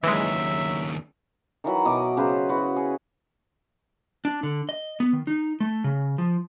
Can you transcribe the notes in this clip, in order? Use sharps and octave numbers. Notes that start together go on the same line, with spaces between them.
D#2 C#3 E3 F#3 G#3 E5
D#3 E3 F#3 B5
B2 D#5 D6
C#3 F#3 B4 C5
E4 F#4 B4
G#4
D4
D3
D#5
B3
D#3
D#4
A3
C#3
F3